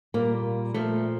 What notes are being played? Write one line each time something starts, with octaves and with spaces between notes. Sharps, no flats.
A#2 G3 A#3
A#2 F3 A3